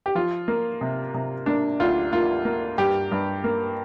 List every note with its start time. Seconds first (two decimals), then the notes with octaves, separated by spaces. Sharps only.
0.06 G4
0.15 F3 F4
0.48 A#3
0.81 C3
1.14 C3
1.46 A#3 D4
1.80 D2 F4
2.13 A#3 F4
2.45 A#3
2.78 G2 G4
3.11 G2
3.44 A#3